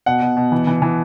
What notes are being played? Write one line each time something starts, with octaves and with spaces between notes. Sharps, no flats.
B2 F#5
B2
B2
E3
E3
E3